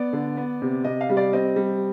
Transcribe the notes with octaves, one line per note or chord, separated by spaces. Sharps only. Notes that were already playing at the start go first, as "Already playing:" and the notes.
Already playing: B3 D5
D3
B3
C3
C3 D#5
F5
G3
D5
C4 D#5
G3